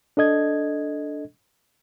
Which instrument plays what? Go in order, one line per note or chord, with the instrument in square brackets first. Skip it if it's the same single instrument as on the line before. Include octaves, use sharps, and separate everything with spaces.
[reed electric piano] D4 A4 D#5 G#6